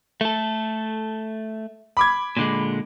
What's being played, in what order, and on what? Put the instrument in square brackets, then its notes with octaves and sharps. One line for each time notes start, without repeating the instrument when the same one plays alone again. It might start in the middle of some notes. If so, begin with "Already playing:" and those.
[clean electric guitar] A3 A4
[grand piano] B5 D6 G#6
[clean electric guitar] A#2 D3 G#3